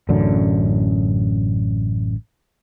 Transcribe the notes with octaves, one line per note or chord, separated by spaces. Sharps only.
A1 F#2 D3